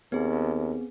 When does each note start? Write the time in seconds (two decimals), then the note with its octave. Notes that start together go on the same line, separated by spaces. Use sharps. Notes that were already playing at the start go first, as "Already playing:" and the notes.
0.12 D#2 B3 C4 G#4